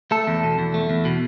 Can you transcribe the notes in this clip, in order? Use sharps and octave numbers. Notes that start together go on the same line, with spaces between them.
A3 A4
E2
B2
E2
A3
E2
B2